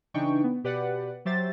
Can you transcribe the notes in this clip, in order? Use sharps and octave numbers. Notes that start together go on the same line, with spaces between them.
C#3 E3 D4 D#4 G5 C#6
B3
B2 G4 B4 D5 F#5
F#3 G4 C5 E5 A6